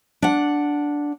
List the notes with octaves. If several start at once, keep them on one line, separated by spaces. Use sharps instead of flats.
D4 F#5